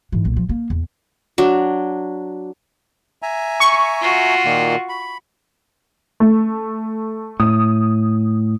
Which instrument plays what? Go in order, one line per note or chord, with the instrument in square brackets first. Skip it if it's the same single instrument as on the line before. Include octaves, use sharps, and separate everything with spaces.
[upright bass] G#2 E3
B1 A#2
F3
A#3
E2
[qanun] F#3 D4
[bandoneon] E5 G#5 A#5
[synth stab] C#6
[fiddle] F4 F#4
[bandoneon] A#2 D#3 A#3
B5
[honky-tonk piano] A3
[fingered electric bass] A2 [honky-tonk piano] D#6